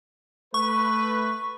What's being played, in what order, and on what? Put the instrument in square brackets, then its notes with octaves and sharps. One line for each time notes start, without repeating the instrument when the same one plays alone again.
[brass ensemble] A3 B4 [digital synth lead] C#6